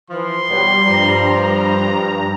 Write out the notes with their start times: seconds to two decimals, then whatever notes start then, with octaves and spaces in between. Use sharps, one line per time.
0.10 E3 F3 C6
0.50 B2 F#3 G3
0.86 G2 F3 G3 A#5